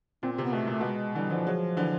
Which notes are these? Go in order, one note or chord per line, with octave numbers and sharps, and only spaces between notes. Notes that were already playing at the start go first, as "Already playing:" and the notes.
A#2 C4
C4
C3
B3
B2 A3
A#2 A3
B2 G#3
D3 E3 G3
D3 E3 F3
F#3 G#3
D3 E3